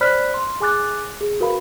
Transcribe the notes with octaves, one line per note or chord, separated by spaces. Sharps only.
C5 D5 B5 F6 F#6 B6
C6
G#4 G#5 D6 F#6 A6
G#4
F#4 A#4 B4 F5 B5